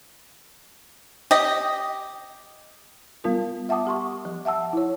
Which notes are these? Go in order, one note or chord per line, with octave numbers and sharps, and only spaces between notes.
G4 D#5
G3 B3 F4 A#4
E5 F#5 A5 D6 D#6
G4 C6 C#6
F3
E5 F#5 A5 E6
E4 C#5